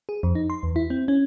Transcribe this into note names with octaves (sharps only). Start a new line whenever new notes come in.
G#4
F2
D#4
C6
E2
E4
C4
C#4